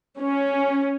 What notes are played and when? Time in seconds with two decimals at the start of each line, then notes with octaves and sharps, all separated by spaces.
0.20 C#4